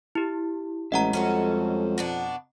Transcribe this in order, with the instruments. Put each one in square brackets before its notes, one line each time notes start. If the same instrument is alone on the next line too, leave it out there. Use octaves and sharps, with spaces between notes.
[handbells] E4 G4
[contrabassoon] A1 [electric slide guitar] G3 G#3 E5 [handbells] D#5 F#5 A#5
[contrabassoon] F2 [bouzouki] C#4 F#4 A4
[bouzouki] B2 B3 D4